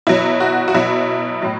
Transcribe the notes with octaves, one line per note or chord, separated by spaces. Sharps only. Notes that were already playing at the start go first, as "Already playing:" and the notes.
B2 F#3 E4
F#4
F#4
B2 F#3 E4
A2 F#3